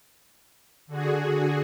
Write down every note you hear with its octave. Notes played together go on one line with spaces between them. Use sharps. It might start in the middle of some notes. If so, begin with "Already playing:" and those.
D3 F#4 G#4